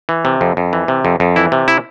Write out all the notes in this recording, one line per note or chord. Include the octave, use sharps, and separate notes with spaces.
E3
C3
F2
F2
E3
C3
F2
F2
E3 E4
C3
E4